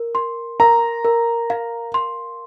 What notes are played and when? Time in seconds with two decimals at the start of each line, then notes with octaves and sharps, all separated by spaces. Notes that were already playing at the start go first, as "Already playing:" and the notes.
Already playing: A#4
0.15 C6
0.60 A#4 A#5
1.05 A#4
1.50 F5
1.94 C6